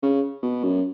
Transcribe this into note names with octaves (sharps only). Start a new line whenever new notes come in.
C#3
B2
F#2